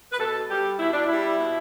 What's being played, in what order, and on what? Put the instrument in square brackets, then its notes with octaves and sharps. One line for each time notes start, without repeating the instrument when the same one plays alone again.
[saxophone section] B4
B2 A4
G3 G4
B2 E4
D4
G3 E4
B2